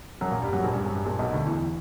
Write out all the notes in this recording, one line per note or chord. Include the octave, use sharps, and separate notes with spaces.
F#2 F#3
A#2 A#3
G2 G3
F#2 F#3
A#1 A#2
G2
F#2
G2
A#1 A#2
B1 B2
D2 D3
E2 E3